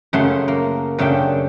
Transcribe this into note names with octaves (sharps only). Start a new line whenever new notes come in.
F#2 C#3 A3 F#5 A5 C6
A#3
F#2 C#3 A3 D4 G5